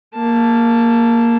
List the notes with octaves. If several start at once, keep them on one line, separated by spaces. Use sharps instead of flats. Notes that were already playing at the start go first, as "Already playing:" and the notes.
A#3 A5